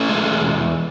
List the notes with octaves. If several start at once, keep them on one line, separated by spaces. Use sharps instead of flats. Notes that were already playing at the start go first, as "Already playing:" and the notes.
Already playing: A3 C#4
G#3
E2
E2